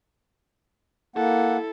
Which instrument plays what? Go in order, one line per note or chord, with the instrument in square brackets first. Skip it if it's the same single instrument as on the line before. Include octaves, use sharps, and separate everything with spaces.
[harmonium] A#3 F#5 [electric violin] E4 A4